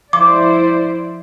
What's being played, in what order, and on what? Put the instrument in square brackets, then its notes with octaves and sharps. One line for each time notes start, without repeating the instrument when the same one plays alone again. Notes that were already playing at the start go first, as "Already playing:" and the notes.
[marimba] F3 [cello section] E4 C5 D5 [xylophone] D6